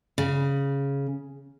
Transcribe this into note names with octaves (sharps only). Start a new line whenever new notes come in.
C#3